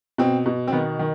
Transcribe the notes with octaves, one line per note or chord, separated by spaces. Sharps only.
B2 C4
B2
C4
D#3 B3
D#3